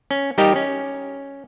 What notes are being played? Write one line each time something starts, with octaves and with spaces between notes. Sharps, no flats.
C#4
G3 D#4 G4 A#4 D#5
C#4